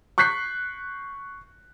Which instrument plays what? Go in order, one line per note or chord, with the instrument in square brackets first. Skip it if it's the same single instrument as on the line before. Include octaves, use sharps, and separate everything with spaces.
[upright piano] C#6 F#6 G6 B6 C7